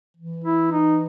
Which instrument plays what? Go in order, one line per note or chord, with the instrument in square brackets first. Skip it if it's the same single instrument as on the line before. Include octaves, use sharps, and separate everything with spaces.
[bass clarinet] E3
[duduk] E4
D#4